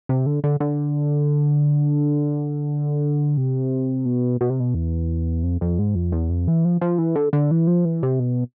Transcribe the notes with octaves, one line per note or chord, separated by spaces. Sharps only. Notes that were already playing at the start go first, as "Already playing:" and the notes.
C3
D3
D3
D3
C3
B2
B2
C3
B2
E2
F2
F2
G#2
F2
E2
F2
E3
F3
F3
E3
D3
D3
E3
F3
E3
C3
B2